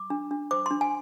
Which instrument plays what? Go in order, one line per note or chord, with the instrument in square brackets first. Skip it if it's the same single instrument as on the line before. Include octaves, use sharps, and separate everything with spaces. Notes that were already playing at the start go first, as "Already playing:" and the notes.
Already playing: [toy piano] D6
D4
D4
C5 D6
D4 C6
G#5